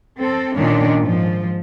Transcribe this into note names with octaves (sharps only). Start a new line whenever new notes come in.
C4 A4
A#2 D#3 C#4 D4
G#2 F3